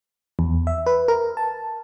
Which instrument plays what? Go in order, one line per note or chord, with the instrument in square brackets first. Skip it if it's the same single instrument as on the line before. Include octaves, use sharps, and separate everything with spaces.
[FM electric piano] E2
E5
B4
A#4
A5